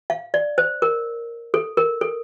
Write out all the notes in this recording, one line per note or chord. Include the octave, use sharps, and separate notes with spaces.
F5
D5
C5
A#4
A4
A#4
A4